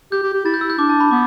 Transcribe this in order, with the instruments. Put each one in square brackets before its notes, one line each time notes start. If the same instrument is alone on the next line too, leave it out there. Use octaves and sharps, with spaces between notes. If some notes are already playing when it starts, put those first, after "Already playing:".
[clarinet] G4 [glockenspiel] G6
[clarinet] G4
G4
[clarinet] E4 [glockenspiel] A6
[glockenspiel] G6
E6
G6
[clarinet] D4 [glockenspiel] D6
[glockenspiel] A5
B5
[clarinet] B3 [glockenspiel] D6